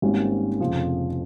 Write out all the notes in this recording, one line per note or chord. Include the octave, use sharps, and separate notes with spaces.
G#1 G#2 G3 A#3 C#4
F1 F2 C#3 F3